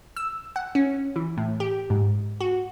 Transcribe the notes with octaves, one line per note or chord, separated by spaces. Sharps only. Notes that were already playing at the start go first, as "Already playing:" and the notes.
E6
F#5
C#4
E3
A2
G4
G#2
F#4